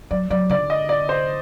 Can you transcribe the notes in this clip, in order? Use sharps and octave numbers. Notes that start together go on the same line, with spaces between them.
F#3 D5
F#3 D5
D3 D5
D#5
D5
C5